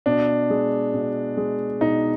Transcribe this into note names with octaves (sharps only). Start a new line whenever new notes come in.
B2 D4
G#3
B2
G#3
B2 D#4